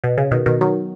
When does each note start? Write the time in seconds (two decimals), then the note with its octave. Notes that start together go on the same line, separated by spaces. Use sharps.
0.04 B2
0.18 C#3
0.31 B2 D#3
0.46 B2 D#3
0.61 D#3 F#3